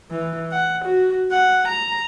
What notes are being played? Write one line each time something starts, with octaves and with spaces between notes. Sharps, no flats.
E3
F#5
F#4
F#5
A#5